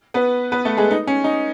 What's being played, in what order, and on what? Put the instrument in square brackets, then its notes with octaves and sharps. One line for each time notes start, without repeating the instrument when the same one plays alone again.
[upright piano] B3 B4
B3 B4
A3 A4
G#3 G#4
D#4
C#4
D#4